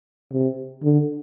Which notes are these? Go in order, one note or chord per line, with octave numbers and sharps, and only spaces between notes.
C3
D3